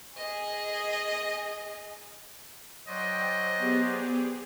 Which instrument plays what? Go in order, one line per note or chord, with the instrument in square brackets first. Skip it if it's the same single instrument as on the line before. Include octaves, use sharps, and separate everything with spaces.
[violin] G#4 D#5
[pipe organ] F#3 C5 D5 [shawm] D#5 [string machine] G5
[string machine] B3 G4 G#4